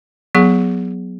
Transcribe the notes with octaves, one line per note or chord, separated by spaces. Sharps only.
F#3 B3 G#4